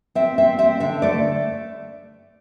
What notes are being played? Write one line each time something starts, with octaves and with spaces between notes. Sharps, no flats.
C4 E5
C4 E5
C4 E5
D3 E5
A3 D5